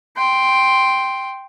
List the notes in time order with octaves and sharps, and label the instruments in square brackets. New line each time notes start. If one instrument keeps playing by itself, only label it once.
[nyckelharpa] G5 C6